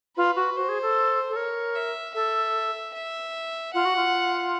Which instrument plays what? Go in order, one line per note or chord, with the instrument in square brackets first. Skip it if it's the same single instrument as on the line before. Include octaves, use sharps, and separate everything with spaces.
[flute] F4 [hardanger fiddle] B4
[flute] F#4
[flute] F#4 [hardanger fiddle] C5
[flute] G#4
A4
A4
[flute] A#4 [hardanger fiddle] C#5
[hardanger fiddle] E5
[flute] A4 [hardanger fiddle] E5
[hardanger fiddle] E5
[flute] F4 [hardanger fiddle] F#5
[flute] F#4
F4